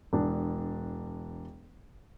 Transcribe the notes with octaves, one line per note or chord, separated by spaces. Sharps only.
E1 D4